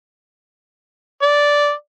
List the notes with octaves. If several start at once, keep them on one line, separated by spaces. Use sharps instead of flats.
D5